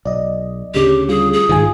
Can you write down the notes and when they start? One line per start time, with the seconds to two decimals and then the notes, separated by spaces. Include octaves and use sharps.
0.05 B1 D5 D#5
0.74 D2 C#3 G4
1.09 G3 F4 G#4
1.33 G#4
1.49 B1 G#2 D#3 G#3 F4 G#5